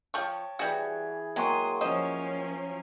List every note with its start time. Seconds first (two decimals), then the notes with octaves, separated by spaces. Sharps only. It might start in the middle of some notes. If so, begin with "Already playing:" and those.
0.14 F3 C#5 G5 A5 C#6
0.59 E3 G3 F#4 G#4
1.36 F#3 G#3 A#3 G5 C6 C#6 D#6
1.81 F3 C#4 C5 D#5